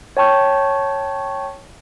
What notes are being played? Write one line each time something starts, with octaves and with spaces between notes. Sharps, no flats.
C#5 G5 A5 C#6 G6